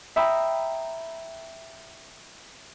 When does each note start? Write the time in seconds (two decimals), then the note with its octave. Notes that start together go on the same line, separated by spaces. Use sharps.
0.16 E5 G5 A#5 B5 D#6